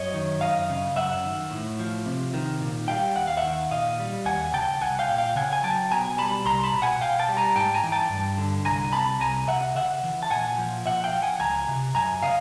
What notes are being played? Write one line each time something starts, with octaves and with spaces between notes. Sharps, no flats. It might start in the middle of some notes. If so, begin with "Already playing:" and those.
Already playing: F#2 C#5 D#5
D#3
F#2 D#5 F5
C#3
F#2 E5 F#5
D#3
A2
F3
C3
D#3
A#2
G3 F5 G5
D#2 F#5
F5
E5 F#5
D#3
A#2 D#5 F5
G3
D#2 F#5 G#5
C#3 G5 A5
C2 F#5 G#5
F5 G5
A#2
F5 G5
C#3 F#5 G#5
G#5
F#3 G5 A5
B2 G#5 A#5
G3 A5 B5
C2 A#5 C6
A5 B5
B2
F#5 G#5
B2 F5 G5
G5 A5
G3
G#5 A#5
G#2 G5 A5
G#5 A#5
E3
G5 A5
G2
D3
C2 G#5 A#5
C3 A5 B5
C2 G#5 A#5
C3 E5 F#5
C#3 E5 F#5
E3
A5
A#2 F#5 G#5
F3
A#2 E5 F#5
F5 G5
F3
F#5 G#5
C#2 G#5 A#5
C3
F#2 G#5 A#5
C#3 D#5 F5